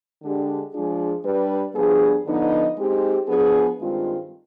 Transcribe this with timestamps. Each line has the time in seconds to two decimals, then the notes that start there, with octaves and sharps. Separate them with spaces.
0.23 D3 G#3 D4 G4
0.74 F3 G#3 D4 F4 G#4
1.25 G3 D4 G4 B4
1.75 G2 F3 B3 D4 G#4
2.26 D3 F3 B3 D#4
2.78 G#3 C4 D#4 G4
3.28 F3 B3 D4 G#4
3.79 G2 D#3 G#3 C4 F4